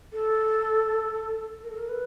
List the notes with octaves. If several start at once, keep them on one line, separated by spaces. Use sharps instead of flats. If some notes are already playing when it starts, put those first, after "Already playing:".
A4
A#4
A4
A#4
B4